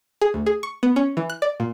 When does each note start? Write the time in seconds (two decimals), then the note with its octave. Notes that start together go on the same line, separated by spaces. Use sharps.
0.21 G#4
0.34 D2
0.46 G#4
0.63 C#6
0.83 B3
0.96 C#4
1.17 E3
1.30 F#6
1.42 D5
1.60 A#2